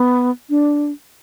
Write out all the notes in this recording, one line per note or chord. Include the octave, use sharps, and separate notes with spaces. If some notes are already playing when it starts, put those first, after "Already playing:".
Already playing: B3
D4